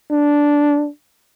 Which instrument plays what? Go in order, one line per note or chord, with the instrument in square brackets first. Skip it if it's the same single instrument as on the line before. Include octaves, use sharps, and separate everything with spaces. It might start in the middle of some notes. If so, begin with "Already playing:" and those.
[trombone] D4